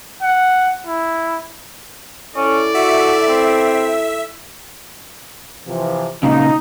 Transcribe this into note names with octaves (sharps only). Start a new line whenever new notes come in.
F#5
E4
C#4 E4 A4 D5
F#4 E5
C4
C3 E3 F3
A#2 C#3 D#4